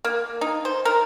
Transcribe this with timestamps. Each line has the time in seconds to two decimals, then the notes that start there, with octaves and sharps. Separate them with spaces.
0.04 A#3
0.41 D#4
0.65 C5
0.85 A#4